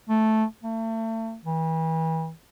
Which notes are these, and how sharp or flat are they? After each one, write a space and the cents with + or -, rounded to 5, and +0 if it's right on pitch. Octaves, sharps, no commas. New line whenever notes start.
A3 -5
A3 +35
E3 -30